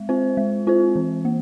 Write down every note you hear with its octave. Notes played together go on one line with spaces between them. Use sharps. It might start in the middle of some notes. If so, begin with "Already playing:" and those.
Already playing: G#3
C4 F4 C5
G#3
C4 F4 C5
E3
A#3